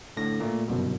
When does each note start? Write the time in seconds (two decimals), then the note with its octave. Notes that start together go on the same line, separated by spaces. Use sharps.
0.17 A2 D3 A#6
0.40 A#2 A3
0.68 G1 C2 F#2 B2